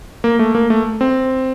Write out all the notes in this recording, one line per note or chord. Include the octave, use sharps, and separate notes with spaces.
A#3
A3
A#3
A3
C4